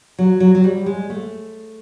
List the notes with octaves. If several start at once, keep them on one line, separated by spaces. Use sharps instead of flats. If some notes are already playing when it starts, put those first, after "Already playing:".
F#3
F#3
F#3
G3
G#3
A3